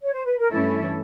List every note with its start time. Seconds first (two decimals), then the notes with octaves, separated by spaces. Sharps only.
0.00 C#5
0.12 C5
0.25 B4
0.38 A#4
0.50 G2 E3 A3 C#4 E4 A4